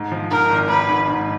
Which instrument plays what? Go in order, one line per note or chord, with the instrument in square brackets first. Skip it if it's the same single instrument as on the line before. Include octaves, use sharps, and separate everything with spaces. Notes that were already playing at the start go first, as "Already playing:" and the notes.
Already playing: [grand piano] G#2
F3
[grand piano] G#2 [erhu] A#4
[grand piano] G#1
[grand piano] G#1 [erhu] B4
[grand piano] G#2
G#2